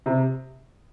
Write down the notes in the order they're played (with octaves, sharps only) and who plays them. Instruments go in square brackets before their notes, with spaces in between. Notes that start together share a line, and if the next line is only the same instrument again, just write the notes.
[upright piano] C3